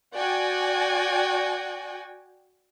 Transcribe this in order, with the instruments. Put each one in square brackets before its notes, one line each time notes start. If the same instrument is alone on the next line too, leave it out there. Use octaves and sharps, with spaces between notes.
[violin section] F#4 D5 G5 G#5